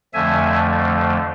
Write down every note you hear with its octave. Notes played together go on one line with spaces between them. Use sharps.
F2 D3 F3 A3 E5 G#5